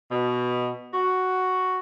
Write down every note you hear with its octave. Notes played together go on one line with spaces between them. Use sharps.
B2
F#4